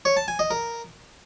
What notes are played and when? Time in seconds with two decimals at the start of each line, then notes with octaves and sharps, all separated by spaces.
0.05 C#5
0.17 A5
0.28 G#5
0.39 D#5
0.51 A#4